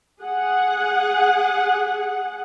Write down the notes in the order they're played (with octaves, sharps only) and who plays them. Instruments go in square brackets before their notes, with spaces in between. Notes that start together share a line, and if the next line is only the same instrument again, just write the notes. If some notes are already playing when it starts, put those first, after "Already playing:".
[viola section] G#4 F#5